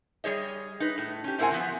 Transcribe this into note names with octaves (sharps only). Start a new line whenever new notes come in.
G3 G#4 C#5 D#5
D#4 B4
A2
C#4 G4
G#2 C4 E4 A#4 F#5 G#5
E3 F3 B3